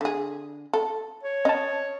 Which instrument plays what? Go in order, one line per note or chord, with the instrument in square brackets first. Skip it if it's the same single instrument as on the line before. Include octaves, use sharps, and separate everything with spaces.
[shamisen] D3 G#4
A4
[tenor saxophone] C#5
[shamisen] C#4 [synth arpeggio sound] D#5 A5